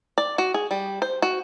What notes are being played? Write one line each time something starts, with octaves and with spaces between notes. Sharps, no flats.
D5
F#4
G#4
G3
C5
F#4